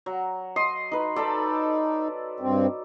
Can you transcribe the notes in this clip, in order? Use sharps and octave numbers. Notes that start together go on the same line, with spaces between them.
F#3
D#5 C6
D#4 B4
D#4 A4 D5 B5
G2 C4